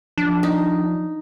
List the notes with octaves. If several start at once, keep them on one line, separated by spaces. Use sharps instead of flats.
F3 D4
D#4